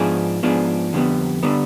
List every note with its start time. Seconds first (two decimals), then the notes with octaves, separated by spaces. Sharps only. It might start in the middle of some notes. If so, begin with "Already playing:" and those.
Already playing: G#2 F3 B3 D4 G#4
0.43 G#2 F3 B3 D4 G#4
0.93 F2 D3 G3 B3
1.43 D3 G3 B3